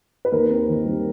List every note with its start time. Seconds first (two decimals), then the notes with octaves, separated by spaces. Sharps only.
0.25 B4
0.32 D#2 A#4
0.50 C4
0.68 D#3
0.85 G3